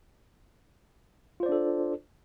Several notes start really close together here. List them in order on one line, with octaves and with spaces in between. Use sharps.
F4 C5 D5 D4 A4